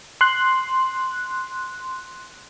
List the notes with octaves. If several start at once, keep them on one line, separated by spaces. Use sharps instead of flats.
C6 F#6